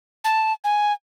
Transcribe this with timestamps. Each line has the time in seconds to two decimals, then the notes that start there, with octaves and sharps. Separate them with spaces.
0.25 A5
0.64 G#5